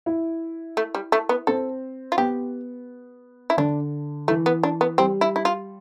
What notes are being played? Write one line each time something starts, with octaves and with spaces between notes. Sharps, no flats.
E4
A3
G3
A3
B3
C4 A4
F4
B3 G4
E4
D3 D4
E3 A3
B3
D4
B3
G3 C4
E4
E4
F4